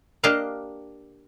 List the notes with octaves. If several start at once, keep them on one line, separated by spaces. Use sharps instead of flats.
A#3 D4 G4 D#5 F5 A#5